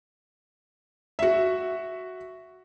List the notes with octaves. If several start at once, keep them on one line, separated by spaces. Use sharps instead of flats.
F#4 E5